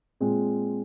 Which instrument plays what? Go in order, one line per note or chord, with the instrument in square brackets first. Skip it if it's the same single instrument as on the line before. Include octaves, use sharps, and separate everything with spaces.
[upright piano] A#2 G#3 C4